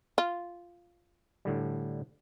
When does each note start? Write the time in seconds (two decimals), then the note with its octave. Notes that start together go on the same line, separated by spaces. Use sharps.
0.18 F4
1.45 A2 D3 G3